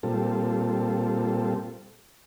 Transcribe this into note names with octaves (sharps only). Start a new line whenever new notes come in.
A#2 G3 C4 F4 A4